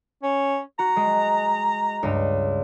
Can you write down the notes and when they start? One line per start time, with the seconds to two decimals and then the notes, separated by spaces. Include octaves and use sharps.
0.23 C#4
0.79 F#4 A#5
0.96 G#3
2.03 C#2 G2